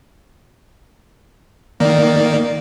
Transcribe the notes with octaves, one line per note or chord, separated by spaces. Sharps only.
D#3 A#3 D5